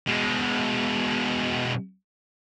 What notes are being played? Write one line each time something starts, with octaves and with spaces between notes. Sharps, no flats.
B2 G#3